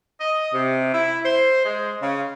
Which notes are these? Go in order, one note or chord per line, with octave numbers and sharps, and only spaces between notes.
D#5
C3
E4
C5
G#3
C#3